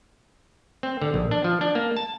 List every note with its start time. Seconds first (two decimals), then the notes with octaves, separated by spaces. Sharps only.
0.83 C4
1.02 D3
1.14 A#1
1.31 D4
1.44 F3
1.61 D4
1.75 A#3
1.97 A5